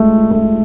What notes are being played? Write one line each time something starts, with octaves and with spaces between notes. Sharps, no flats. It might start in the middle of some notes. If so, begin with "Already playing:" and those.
Already playing: G#3 A3
A3